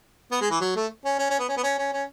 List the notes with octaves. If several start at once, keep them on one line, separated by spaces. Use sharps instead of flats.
B3
G#3
E3
F#3
A3
C#4
C#4
C#4
B3
C#4
B3
C#4
C#4
C#4